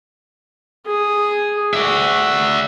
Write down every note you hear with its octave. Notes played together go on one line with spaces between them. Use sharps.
G#4
F#4 D5 E5